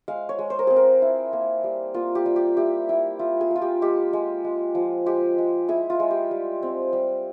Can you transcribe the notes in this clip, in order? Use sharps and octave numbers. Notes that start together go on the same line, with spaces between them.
G#3 F5
C#5
G#3
C5
A#4
C4 G#4
A#4
E4
A#3
G3
A#3 F4
G4
G3
G4
E4 G4
E4
E4 F4
G#4
A#3
F4
G4
G#3 G4
G#3
G#3
F3
G#3 G4
G#3
E4 G#4
F4
G#3
G4
G3
C4
G3